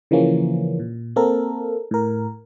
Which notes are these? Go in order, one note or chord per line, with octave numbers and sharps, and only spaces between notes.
C#3 E3 F3 A#3 C#4
A#2
A#3 C4 A4 A#4
A2 A#4